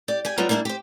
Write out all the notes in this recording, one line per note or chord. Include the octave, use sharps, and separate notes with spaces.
G4 D5
G4 G#4 G#5
F#3 G3 B3 F4
G3 A#3 D4 E4 G#4
G4 C5